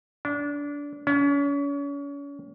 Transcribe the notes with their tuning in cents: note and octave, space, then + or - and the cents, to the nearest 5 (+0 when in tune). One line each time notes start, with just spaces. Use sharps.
D4 -25
C#4 +35